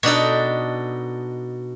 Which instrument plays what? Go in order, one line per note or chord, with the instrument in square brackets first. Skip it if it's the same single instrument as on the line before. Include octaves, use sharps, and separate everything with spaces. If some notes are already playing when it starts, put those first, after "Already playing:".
[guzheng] B2 D4 D#4 A4